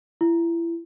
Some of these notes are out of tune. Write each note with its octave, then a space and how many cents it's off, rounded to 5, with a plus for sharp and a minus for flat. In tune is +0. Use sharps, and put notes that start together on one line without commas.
E4 +30